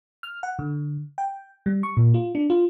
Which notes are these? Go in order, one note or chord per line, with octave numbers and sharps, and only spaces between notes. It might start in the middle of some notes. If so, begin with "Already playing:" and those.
F6
F#5
D3
G5
G3
C#6
A#2
F4
D4
F4